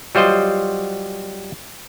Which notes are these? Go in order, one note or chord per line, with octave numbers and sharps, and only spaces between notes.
F#3 G3 F4 C5 D#5